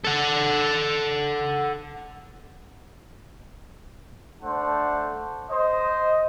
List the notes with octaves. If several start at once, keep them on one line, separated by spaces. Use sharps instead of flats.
A4 F#5
A3 D4 C5 F#5 A5
C5 D#5